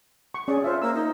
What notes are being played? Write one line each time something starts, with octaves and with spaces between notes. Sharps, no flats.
C#6
C#4 G#4 D5 C#6
F4 C5 E5
A#3 E6
D#4